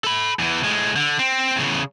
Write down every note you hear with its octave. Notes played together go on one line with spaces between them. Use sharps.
A4 B5
E2 E3
A2 G#3
D3
C4
E2 C#3